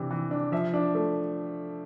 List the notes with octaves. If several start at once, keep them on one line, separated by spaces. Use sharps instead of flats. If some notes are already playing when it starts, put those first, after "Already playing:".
Already playing: C3 E3 D4
E3
D4
F3 E5
D4
A3